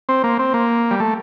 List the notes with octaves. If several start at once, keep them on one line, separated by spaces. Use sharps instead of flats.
C4
A#3
C4
A#3
G3
A3